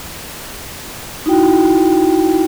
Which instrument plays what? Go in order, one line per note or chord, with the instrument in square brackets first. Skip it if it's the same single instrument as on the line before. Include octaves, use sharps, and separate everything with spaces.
[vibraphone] D#4 E4 F#4 G5